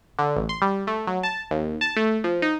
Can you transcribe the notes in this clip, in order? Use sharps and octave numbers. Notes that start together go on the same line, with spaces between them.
D3
A1
C6
G3
A3
F#3
A5
D#2
A5
A3
F3
D#4